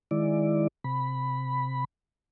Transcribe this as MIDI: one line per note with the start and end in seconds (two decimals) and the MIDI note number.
0.11 0.67 51
0.11 0.67 56
0.11 0.67 64
0.11 0.67 74
0.84 1.84 48
0.84 1.84 83